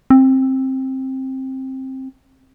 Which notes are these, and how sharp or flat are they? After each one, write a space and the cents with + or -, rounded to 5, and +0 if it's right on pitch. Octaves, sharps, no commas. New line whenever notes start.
C4 +15